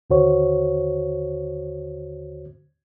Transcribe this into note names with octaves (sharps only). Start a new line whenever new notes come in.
D#2 D3 F#4 C5 C#5